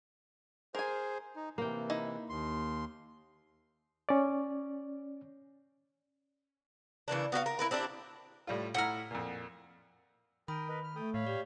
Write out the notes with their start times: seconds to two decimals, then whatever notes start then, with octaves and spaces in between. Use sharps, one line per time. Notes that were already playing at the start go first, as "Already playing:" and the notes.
0.75 G#4 A#4 C5 G#5
1.36 D#4
1.58 C3 E3 A#3 G5
1.90 D#4 E4
2.29 D#2 C6
4.09 C#4 D5
7.08 C#3 E3 A#3 D4
7.32 B3 F#4 G4 F5
7.46 A#4
7.59 E4 A#4 B4
7.71 C4 D4 E4 G4
8.47 A2 G3 F4
8.74 A2 E4 F#5 A#5 F6
9.11 F2 A#2
10.48 D#3 A#4 G5 B5 D#6
10.69 A#4 B4 D#5
10.84 F6
10.96 A3 A4 G5 D#6
11.14 A2 C#5 F5 B5
11.27 G4 D5